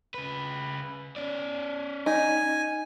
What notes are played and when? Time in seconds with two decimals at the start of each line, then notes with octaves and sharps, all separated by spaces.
0.14 C#3 B4
1.16 C#4 D5
2.06 D#4 G#5